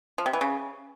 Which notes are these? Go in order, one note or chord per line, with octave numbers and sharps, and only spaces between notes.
F3
C3
E3
C#3